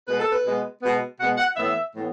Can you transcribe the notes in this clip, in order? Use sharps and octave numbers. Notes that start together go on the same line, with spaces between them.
B2 G#3 B3 B4
A4
B4
B2 G#3 B3
B2 G#3 B3
B2 G#3 B3 F#5
F#5
A2 E3 B3 E5
A2 E3 B3